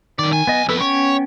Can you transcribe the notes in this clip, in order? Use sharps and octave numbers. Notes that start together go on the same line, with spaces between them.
F#2 D#3 D5
B1 G#5
B3 D#5
F2 B3 A4 B4 E6
B3 C#4 C#5 G5